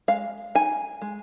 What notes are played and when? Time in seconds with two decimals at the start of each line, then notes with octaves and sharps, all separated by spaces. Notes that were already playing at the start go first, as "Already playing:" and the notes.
0.08 G#3 F5
0.55 D#4 G#5
1.02 G#3